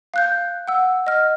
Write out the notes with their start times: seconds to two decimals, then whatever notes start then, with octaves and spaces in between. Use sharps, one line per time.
0.14 F5 F#6 G6
0.68 F#5 E6
1.07 D#5 F6